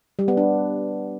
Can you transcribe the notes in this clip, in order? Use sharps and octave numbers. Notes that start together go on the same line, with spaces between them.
G3
B3
D4